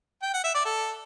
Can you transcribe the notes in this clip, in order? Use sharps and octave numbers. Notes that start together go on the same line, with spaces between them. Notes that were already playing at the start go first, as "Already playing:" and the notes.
G5
F#5
E5
D5
A4